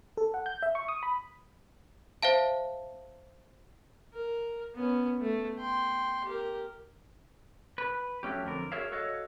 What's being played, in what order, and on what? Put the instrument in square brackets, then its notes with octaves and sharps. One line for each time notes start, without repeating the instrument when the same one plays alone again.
[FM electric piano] A4
F#5
G6
E5
C#6
D#6
B5
[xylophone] C5 E5 F5 A5
[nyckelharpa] A#4
B3 C#4
A3
G5 C6
G4 A#4
[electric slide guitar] B4
F#3 A3 C#4 G4
F2 D3 A#4
F#4 G#4 A#4 C#5 E5 F5
F#4 A4 C#5 D#5 F5